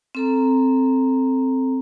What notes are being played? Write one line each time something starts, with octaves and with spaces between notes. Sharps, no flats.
C4 A4 A#5